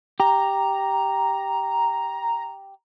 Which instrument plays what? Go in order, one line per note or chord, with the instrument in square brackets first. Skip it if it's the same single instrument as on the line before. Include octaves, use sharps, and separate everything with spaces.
[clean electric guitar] G4 [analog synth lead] A#5